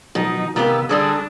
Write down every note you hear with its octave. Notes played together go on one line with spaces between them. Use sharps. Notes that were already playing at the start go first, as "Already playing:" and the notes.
B2 D#3 F3 F#3 D#4
C3 D#3 B3 G4 F5 E6
D3 G3 D4 G#4 A#5 D#6 E6